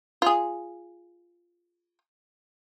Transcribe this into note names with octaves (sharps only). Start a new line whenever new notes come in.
F4 G#4